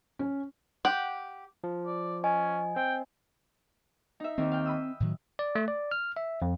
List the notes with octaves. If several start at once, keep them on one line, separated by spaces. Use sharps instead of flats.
C#4
G4 F#5 G5
F3
D5
C#4 D#5 G#5
C4 G5
D#4 E5
D#2 D#3 C4
F5 G5
B5 D#6 E6
A2 D#3 F#3
D5
A3
D5
F6
E5
F2